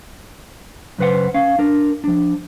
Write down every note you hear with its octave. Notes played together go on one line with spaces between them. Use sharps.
F#2 C#3 B4 C5 F#5
C#4 F5
D4 A#4
F3 D4